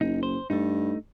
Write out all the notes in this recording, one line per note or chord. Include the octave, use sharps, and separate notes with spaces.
F#1 D#4
C5
G2 A3 D#4